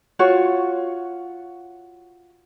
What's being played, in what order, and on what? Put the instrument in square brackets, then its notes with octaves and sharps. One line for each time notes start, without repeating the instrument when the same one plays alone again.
[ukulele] F4 F#4 C#5